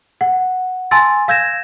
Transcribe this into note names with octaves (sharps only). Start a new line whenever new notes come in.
F#5
G#5 A5 C6 E6 A6
F5 E6 G6 G#6 A#6 E7